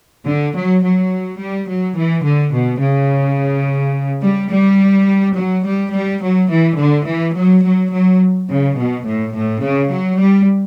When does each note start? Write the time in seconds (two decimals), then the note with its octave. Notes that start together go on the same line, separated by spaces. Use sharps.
0.26 D3
0.54 F#3
0.82 F#3
1.39 G3
1.67 F#3
1.95 E3
2.24 D3
2.53 B2
2.81 C#3
4.23 G3
4.51 G3
5.36 F#3
5.66 G3
5.93 G3
6.23 F#3
6.51 E3
6.79 D3
7.08 E3
7.36 F#3
7.64 F#3
7.93 F#3
8.50 C#3
8.78 B2
9.06 A2
9.35 A2
9.63 C#3
9.92 F#3
10.20 G3